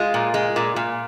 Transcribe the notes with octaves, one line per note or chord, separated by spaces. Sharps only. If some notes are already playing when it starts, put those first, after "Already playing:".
Already playing: G#3 F4
A#2
G#3
A#2
A#2